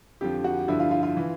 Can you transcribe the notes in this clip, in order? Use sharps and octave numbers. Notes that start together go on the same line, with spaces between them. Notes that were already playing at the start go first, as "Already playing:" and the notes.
F2 D3 F3 G4
F#4
G2 D3 F3 E4
F4
F4
F4
E3